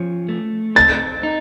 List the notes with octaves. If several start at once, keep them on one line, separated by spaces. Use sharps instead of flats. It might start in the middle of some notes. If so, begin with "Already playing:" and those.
Already playing: F3 C#4
A3
C4 A6
D#4